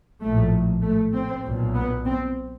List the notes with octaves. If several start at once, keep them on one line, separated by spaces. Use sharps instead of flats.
A#1 A2 A3
A3
C4
B1 A#2
B3
C4